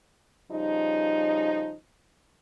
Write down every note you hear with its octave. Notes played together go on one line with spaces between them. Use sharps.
C#3 F3 G3 D#4